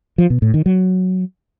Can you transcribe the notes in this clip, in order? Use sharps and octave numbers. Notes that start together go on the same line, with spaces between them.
F3
B2
A2
D#3
F#3